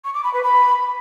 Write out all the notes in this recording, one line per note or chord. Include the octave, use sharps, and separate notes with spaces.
C#6
D6
B5
B4
B5